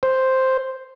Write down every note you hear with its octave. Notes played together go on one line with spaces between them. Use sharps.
C5